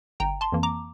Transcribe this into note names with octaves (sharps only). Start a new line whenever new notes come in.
G1 G5 A#5
A5 C6
F2 E3 A#3
A#5 D6